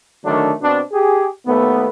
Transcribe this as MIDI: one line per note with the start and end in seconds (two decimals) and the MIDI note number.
0.25 0.51 50
0.25 0.51 51
0.25 0.51 54
0.25 0.51 57
0.25 0.51 62
0.61 0.80 47
0.61 0.80 60
0.61 0.80 62
0.91 1.25 67
0.91 1.25 68
1.46 1.88 39
1.46 1.88 57
1.46 1.88 59